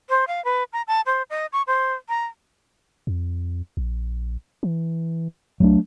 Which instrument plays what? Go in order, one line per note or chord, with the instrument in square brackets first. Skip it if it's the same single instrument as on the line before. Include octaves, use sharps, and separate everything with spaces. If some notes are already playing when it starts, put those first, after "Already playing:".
[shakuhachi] C5
F5
B4
A#5
A5
C5
D#5
C#6
C5
A#5
[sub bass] F2
A#1
E3
[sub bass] C2 [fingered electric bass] F#3 A3 D4